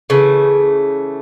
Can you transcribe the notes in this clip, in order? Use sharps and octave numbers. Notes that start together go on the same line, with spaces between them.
C#3 E3 A3